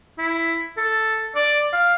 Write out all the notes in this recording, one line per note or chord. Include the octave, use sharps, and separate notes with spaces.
E4
A4
D5
F5